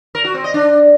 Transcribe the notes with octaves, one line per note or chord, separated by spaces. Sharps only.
A#4
F#4
C4
D#5
D4